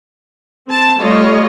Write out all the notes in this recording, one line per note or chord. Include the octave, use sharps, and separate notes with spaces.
C4 A5
G3 A3 F4 C#5 D#5